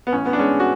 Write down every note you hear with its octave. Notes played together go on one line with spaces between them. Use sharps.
B3
A1 C#4
B3
D4
G#3 C#4
F#4